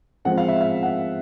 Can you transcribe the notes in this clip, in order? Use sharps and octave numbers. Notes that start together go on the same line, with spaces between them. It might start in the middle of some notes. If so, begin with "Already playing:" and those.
F3 G#3 C4 F#5
F5
E5
F5
F#5